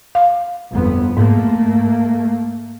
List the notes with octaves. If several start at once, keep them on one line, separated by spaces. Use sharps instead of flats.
F5
G1 F2 B3
G#2 A3 A#3